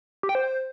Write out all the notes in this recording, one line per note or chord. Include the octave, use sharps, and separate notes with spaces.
G4
G5
C5